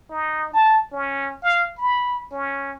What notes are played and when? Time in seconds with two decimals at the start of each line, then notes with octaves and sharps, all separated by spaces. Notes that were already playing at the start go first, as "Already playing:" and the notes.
0.11 D#4
0.54 A5
0.92 C#4
1.43 F5
1.78 B5
2.32 C#4